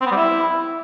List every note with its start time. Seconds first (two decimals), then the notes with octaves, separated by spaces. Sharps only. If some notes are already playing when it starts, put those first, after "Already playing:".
0.01 C4
0.06 B3
0.11 G3
0.16 E4